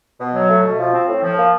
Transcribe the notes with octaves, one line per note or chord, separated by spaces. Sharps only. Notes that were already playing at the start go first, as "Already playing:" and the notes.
B2
F#3
A3
B2
F3
C4
A2
F3
A#3